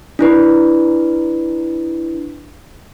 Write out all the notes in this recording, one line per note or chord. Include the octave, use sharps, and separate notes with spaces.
D4 E4 B4